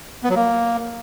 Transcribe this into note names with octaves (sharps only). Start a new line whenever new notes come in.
B3
F#3
A#3